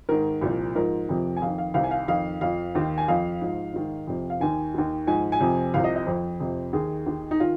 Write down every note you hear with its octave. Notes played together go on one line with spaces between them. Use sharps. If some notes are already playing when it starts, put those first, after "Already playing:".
G#2 D#3 A#4
C2 A#2 F3
G#2 F3 A#4
F2 C3 F3
G#5
F2 D#3 F5
F5
C2 C3 D#3 F5
G#5
F5
F2 D#3 F5
F2 F3 F5
D#2 D#3
G#5
F2 F3 F5
G#2 F3
G#2 D#3
F2 C3 F3
F5
D#2 D#3 G#5
D#2 D#3
G#2 F3 G#5
G#5
F2 C3 F3
C2 C3 F3 F5
D#5
D#5
F2 F3 C5
F2 C3 F3
D#2 D#3 G#4
D#2 D#3
D#4
D#3 F4